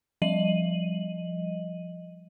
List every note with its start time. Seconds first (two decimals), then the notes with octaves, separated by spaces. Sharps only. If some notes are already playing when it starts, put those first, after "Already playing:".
0.22 F3 G3 D#5 D#7 F#7